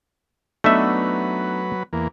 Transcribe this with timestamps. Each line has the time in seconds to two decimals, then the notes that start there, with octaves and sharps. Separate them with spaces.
0.64 F#3 A3 B3 D4 D#4 B4 E5
1.93 E2 A#3